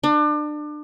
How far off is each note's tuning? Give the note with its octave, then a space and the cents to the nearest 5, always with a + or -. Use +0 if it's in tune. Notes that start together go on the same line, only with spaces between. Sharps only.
D4 +30